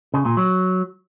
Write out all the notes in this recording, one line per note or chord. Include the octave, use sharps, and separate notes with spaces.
C#3
A#2
F#3